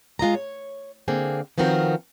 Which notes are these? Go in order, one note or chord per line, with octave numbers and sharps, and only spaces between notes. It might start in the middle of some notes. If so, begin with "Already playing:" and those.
G#3 F4 D#5 A#5
C#5
D3 A#3 C4 G#4
D#3 F3 B3 C4 F#4 A#4